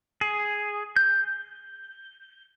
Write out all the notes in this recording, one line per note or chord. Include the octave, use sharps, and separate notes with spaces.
G#4
G6